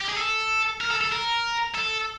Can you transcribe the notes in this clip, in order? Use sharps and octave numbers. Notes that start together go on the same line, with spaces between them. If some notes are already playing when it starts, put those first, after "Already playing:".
G4
G#4
A4
A#4
A4
A4
A#4
A4